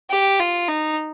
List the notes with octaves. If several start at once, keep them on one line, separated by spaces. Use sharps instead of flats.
G4
F4
D#4